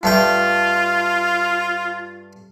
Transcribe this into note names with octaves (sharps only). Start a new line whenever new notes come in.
G2 A3 F4 G5